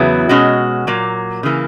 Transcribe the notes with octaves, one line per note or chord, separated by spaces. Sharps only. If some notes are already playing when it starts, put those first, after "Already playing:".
Already playing: E2 C#3 F#3 B3 E4
B2 G#3 C#4 F#4
A#2 F#3 A#3
C#3 E3 A#3